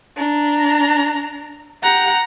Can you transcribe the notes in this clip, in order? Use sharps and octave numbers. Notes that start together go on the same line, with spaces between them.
D4 A#5
G4 F#5 A#5